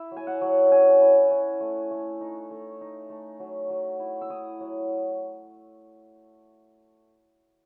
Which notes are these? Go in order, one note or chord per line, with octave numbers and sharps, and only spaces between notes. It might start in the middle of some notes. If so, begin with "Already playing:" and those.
Already playing: E4 E5
F#3
G#5
F#5
F#3
C#4 G#5
E4
C#4
A3
A3
D#4
A3
D#4
A3
F#3
F#3
E4
E6
E4 D#6
F#3